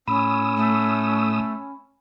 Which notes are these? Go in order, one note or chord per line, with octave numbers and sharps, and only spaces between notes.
A2 C#4 B5 D#6 E6
A3